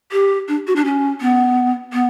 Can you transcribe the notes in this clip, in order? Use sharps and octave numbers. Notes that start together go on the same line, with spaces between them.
G4
D4
F#4
D4
C#4
B3
B3